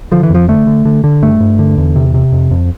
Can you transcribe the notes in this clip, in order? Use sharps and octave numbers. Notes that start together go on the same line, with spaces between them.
D3 F3
E3
F2 F3
D3 A3
D3
D3
D3
G2 A3
G2
D3
E2
C3
C3
F2
F2